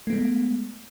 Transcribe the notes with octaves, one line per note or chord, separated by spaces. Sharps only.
G#3 A3 B3